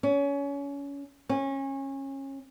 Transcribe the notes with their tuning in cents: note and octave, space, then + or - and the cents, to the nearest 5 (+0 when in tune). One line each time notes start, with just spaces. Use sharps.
C#4 +25
C#4 -25